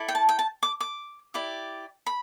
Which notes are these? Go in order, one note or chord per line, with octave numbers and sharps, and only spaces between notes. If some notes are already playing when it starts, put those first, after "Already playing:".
Already playing: E4 A4 D5
G5
A5
G5
A5
D6
D6
E4 G4 D5
B5